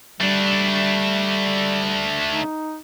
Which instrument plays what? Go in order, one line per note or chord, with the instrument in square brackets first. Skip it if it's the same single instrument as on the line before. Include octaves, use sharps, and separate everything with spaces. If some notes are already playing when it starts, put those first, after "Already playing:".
[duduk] G3 [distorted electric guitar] A3 D4
[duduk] D#4